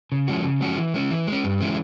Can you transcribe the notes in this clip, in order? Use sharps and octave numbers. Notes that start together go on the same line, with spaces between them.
C#3
F3 G#3 C#4 F#4
C#3
F3 G#3 C#4 F#4
E3
G#3 C#4
E3
G#3 C#4
G2
E3 G#3 C#4